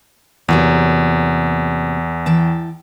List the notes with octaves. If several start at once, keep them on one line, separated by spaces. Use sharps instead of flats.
E2 C3 F#3 A#3
E3 G5 A5